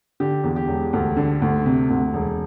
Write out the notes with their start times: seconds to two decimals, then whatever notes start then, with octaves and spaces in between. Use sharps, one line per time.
0.20 D3 G4
0.44 E2
0.56 G4
0.68 E1
0.93 D2
1.17 D3
1.42 D2
1.66 C3
1.90 D2
2.14 E1